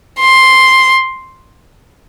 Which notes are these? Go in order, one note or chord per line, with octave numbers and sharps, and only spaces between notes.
C6